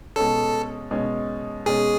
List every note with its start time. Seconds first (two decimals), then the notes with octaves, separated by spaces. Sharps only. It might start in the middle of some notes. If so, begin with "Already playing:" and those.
0.16 B2 G#3 C#4 A4
0.91 B2 G#3 C#4
1.66 B2 G#3 C#4 G#4